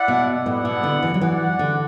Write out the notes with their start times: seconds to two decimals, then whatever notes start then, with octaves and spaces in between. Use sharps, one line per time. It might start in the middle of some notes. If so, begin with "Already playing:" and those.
Already playing: E4 D5 F#5
0.08 B2
0.45 A2 B3 E4 D5 F#5
0.65 B2
0.83 D3
1.03 E3
1.14 F#3
1.21 E3 F#4 D5 F#5
1.59 D3